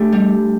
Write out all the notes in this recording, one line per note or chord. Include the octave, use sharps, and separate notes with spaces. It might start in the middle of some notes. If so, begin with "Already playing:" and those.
Already playing: A3 D4 G4
G3